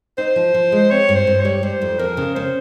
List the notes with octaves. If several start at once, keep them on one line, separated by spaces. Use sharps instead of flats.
D#4 C5
F3
F3
G#3
C4 C#5
G2
C5
G2
C#5
G3
G3 C5
F2
F2 A#4
C#3
C#4 C5